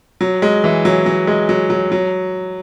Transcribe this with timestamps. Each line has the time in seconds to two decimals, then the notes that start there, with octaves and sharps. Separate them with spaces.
0.21 F#3
0.42 G#3
0.64 E3
0.85 F#3
1.06 F#3
1.27 G#3
1.49 F#3
1.70 F#3
1.92 F#3